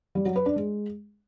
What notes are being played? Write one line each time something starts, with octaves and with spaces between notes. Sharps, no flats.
G3
F#3
B4
D4
G#3